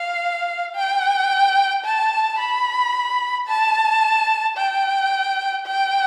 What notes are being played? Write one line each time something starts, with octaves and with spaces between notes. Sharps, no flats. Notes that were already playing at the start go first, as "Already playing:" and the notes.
Already playing: F5
G5
A5
B5
A5
G5
G5